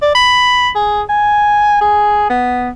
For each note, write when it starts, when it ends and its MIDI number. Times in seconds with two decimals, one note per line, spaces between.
0.02 0.12 74
0.15 0.69 83
0.75 1.02 68
1.10 1.77 80
1.81 2.25 68
2.30 2.70 59